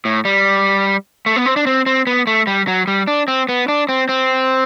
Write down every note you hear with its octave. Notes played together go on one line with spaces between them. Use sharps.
A2
G3
A3
B3
C4
D4
C4
C4
B3
A3
G3
F#3
G3
D4
C4
B3
D4
C4
C4